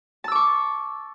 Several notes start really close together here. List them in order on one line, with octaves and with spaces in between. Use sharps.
A5 E6 D6 C#6